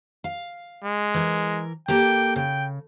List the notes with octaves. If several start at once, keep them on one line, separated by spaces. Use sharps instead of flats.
F5
G#3
E3 A#4
A#3 G4 A4 G5
C#3 G5